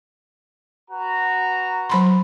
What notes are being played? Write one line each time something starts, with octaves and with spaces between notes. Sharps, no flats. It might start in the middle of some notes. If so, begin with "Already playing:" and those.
F#4 B4 A#5
F#3 B5 C6